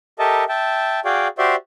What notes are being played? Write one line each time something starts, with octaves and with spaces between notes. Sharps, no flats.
G4 A4 A#4 D#5 E5 A5
E5 G5 A5
F#4 G#4 D5 F5 G5
F#4 G4 C5 D5 E5 C6